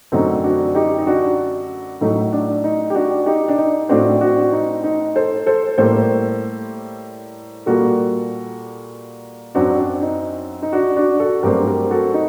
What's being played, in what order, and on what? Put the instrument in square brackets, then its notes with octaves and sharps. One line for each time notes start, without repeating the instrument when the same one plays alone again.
[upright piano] F#2 D3 F#3 A3 C4 D#4
D4 F#4
D#4 G4
D#4
D4 F#4
A2 F#3 A3 D#4
D4
D#4
G4
D4 F#4
D#4 G4
D4
D#4
A2 A3 C4 D4 F#4
D4 F#4
F#4
D#4
D#4
A4 C5
A4 C5
A2 G3 A#3 A4 C5
A#2 G3 A#3 F#4 A4
F#2 F#3 C4 D4 F#4
D4
D#4
D#4
D4 F#4
D4 F#4
F#4 A4
G2 F#3 A3 C4 G4 A#4
G4 A#4
F#4 A4
D#4